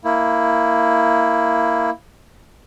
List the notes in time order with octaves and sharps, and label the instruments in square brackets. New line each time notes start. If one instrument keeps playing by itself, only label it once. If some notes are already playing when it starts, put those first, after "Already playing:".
[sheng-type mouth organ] A#3 E4